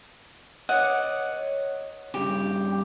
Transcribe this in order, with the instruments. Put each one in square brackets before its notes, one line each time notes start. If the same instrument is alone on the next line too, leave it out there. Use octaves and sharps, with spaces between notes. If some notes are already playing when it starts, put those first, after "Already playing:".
[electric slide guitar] C#5 D#5 [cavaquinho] F#5
[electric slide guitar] G2 C#3 [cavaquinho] G4